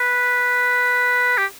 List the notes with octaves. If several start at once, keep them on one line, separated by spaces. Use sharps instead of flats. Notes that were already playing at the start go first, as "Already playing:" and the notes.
Already playing: B4
G4